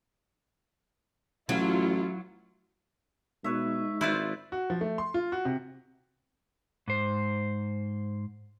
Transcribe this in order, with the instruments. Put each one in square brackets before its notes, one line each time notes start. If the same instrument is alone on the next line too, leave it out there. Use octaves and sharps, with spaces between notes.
[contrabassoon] A1 [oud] F#3 [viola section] E4 F4
[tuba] B2 [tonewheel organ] G#3 D#4 [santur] B4 C#5 E5
[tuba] G#1 [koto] E4 F4 D5 [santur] B4 C5 E5
[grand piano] F#4
F3
A3
C6
F4
F#4
C3
[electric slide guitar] G#2 C5